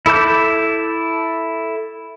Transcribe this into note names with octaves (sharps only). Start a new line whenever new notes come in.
E4 A4 D6 G6